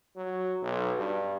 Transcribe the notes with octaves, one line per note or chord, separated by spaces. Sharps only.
F#3
B1
G2